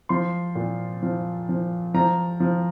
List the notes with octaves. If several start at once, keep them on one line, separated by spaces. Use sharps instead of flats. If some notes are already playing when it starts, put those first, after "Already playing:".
F3 C6
A#2
F3
F3
F3 A#5
F3